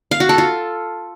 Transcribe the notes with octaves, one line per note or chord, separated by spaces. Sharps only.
F5
F#4
A4
F4